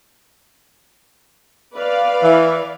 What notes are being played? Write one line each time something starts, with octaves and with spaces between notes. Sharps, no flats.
B4 D5 F5
E3